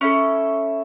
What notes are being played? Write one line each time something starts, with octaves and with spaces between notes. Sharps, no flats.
C#4 E4 A4